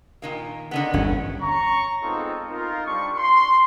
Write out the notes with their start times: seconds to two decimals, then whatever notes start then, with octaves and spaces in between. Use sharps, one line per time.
0.22 A#2 D#3 A#3
0.71 D3 D#3 B3
0.94 G1 E2 G2 C#4
1.41 C#5 A#5 C#6
2.03 G#3 B3 C4 D#4 F4 A4
2.50 D#4 F4 A#4
2.86 G3 C4 D4 C#6
3.18 C6